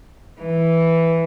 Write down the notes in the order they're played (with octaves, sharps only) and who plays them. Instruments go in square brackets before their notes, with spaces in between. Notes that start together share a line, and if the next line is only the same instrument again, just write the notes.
[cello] E3